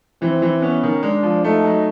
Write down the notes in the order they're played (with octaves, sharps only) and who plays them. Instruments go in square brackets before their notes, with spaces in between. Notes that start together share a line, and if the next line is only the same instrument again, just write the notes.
[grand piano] E3 [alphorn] C4
[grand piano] E3
[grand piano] B3 [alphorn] C#4
[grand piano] D#3
[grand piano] G#3 [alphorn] D4
[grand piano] F3
[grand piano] A3 [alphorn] D#4
[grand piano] F#3